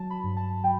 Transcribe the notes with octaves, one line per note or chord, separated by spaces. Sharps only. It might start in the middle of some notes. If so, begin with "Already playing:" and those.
Already playing: F#3 A5
B5
G2
A5
F#3 G5